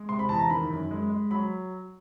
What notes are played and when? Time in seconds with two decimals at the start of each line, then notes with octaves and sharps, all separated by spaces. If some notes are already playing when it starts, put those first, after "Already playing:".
Already playing: G#3
0.09 C3 C6
0.19 B5
0.29 E2 A5
0.39 A#5
0.50 D#3 B5
0.70 F#2
0.91 G#3
1.10 G#3
1.31 F#3 B5